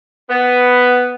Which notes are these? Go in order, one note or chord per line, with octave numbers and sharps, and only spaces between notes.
B3